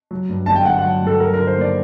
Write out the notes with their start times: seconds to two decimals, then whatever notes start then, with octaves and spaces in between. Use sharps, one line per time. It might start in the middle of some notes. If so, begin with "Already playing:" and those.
0.11 F#3
0.29 G2
0.46 G1 A5
0.56 G5
0.65 G1 F#5
0.79 F#5
0.84 F#3
1.02 G2 A4
1.20 F#3 A#4
1.34 A#4
1.38 D3
1.47 C5
1.57 D#2 D5